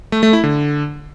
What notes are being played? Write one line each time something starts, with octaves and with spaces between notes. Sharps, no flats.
A3
A3
E4
D3